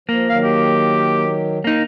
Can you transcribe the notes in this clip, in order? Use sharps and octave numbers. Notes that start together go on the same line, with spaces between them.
F3 A#3
D#3 F#3 F5
G4
A#3 D#4